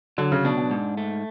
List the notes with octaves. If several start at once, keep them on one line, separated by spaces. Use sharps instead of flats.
D3 F#3
C#3
B2 D4
B2
G#2
A3